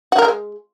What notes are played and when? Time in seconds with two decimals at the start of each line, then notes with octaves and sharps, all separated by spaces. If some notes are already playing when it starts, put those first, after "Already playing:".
0.12 F#4
0.18 A#4
0.25 G#3